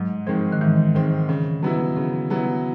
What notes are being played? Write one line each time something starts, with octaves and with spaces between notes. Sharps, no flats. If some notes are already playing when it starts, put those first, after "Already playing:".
Already playing: G#2 F#3
D#3 F3 G#3 C4
D#3
G#2 E3
D#3 G#3 C4
C#3
F#3 B3 E4
C#3
F#3 B3 E4